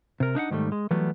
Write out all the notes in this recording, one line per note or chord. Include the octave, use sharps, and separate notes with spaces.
C3 A#4
D4 D#4 F5 F#5
G#2 D#3 F3 G3 A3
G#3
E3 F#3 G3 A3 B3